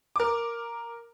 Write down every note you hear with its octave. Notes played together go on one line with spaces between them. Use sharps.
A#4 D6